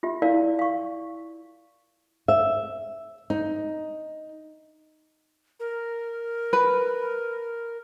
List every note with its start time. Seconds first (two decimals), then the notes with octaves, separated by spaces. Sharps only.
0.03 F4 G4 E5
0.22 E4 A#4 D5 F5
0.59 F5 C#6
2.28 E5
3.30 D#4
5.60 A#4
6.53 B4